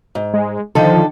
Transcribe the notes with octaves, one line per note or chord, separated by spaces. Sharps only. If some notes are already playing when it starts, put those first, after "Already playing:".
G#2
G#3
D3 D#3 F3 A4